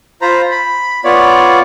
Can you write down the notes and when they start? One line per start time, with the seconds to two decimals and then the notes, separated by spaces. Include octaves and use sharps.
0.22 F4 C5 A#5 B5
0.51 B5
1.04 B3 F4 C#5 D5